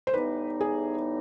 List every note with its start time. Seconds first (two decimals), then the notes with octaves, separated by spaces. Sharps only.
0.07 C5
0.13 A2 E3 G3 B3 D#4 B4
0.61 G#4